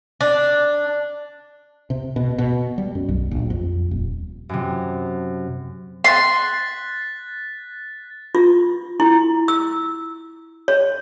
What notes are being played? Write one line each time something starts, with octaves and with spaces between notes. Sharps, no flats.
D4
C3
B2
B2
G3
F#2
B1
A#1
F2
D#1
F#2 C3
C6 F#6 A6 B6
F4
E4
E6
C#5